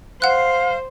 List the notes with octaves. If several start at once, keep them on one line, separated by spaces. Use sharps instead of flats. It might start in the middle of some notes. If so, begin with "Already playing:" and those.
C5 F5 F#5 F#6